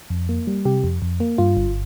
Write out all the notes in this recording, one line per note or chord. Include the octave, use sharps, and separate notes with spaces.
F2
A#3
G3
C3 G4
F2
F2
A#3
G2 F4
G1